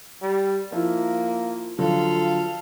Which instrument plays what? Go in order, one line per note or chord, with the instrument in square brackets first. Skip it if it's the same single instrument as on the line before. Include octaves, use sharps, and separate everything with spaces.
[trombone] G3
[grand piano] F3 E4 [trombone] A#3
[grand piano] D3 F3 F#3 [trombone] F4 [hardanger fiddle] A4 F5